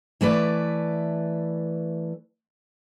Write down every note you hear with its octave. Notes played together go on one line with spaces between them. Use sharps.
E3 A3 B4 D5